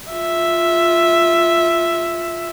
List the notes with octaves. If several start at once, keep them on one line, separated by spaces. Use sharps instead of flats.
F4 E5